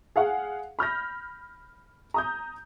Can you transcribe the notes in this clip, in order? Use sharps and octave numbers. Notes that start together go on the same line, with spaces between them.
G#4 F5 F#5
B5 F6 G6 A#6
A#5 D#6 G6